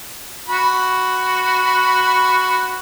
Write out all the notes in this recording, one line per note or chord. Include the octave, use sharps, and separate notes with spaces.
F#4 B5